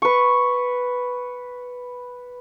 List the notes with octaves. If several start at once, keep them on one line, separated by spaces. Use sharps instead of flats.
B4 C#6